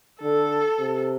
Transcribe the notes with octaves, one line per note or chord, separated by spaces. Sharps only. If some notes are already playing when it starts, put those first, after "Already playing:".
D3 A4
C3